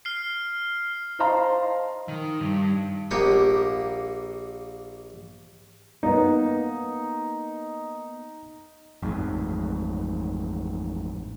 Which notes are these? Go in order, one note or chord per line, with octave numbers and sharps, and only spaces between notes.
F6 C7
C5 D#5 F5 A5 A#5 C6
D#3
G2
A#1 A#3 G4 F#5 B5 D#6
A#3 B3 D#4
A1 F2 G#2